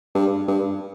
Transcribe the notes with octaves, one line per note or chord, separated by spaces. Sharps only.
G2
G2